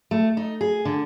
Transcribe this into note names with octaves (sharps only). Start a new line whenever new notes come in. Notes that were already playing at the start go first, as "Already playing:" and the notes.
A3
D#4
G#4
D3